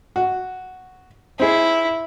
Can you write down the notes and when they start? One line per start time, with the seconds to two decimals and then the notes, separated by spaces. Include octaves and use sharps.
0.16 F#4
1.40 C4 E4 G#4